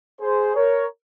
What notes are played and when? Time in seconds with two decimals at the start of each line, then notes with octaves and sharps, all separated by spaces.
0.20 G#4 C5
0.55 A#4 C#5